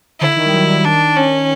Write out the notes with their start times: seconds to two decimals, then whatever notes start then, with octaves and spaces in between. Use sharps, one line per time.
0.20 D3 E4
0.36 D#3
0.45 G3
0.53 F#3
0.68 G3
0.85 D#3 D4
1.16 C#4